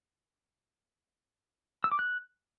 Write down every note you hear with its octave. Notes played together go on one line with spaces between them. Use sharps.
E6
D6
F#6